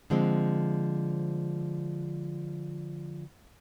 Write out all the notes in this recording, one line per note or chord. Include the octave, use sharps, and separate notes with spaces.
D3 F3 G#3 C4